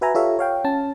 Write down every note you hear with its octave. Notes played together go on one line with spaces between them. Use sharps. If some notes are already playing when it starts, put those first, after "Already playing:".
F#4 B4 E5 G#5 A#5
F4 G4 A4 C#5 E5 F5
C#5 F5 G5
C#4 A5